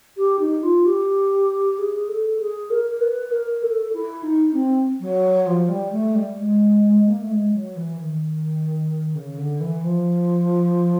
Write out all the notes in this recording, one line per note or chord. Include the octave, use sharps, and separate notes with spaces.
G4
D#4
F4
G4
G#4
A4
G#4
A#4
B4
A#4
A4
E4
D#4
C4
F#3
F3
G3
A3
G3
G#3
A#3
A3
G#3
F#3
E3
D#3
C#3
D3
E3
F3